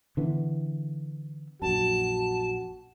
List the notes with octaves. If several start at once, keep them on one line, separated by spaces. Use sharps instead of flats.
D3 E3 B3
A#1 F#2 F#4 A5